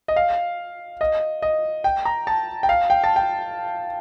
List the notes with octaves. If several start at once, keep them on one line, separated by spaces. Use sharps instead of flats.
D#5
F5
D#5
D#5
G5
A#5
A5
G5
F5
G5
A5
G5